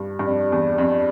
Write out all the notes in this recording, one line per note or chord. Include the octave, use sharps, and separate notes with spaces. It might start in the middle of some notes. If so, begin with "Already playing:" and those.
Already playing: G2
G2
F2 D4
E2
F2